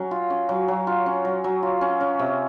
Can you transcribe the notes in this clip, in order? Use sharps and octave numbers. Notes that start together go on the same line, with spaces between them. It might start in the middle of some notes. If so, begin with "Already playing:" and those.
Already playing: F#3 C#4
F4
C#4
F#3
F#3
F4
C#4
F#3
F#3
F4
C#4
C#4
C3